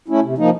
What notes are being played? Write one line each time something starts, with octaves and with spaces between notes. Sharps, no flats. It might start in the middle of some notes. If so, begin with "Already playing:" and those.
A3 C#4 E4
C3
F3 A#3 D#4